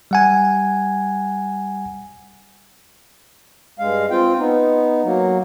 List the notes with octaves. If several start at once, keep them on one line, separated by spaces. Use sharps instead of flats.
G3 F#5 G#5
G2 G#3 F5
C4 F4 G5
B3 D#4
F#3 A#3